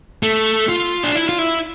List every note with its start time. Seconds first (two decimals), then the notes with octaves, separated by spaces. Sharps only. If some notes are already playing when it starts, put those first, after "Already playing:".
0.23 A3
0.69 F4
1.03 D4
1.15 E4
1.29 F4
1.39 E4